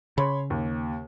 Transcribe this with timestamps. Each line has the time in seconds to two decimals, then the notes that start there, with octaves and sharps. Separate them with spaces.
0.18 C#3 C#5 B5 C6
0.50 D#2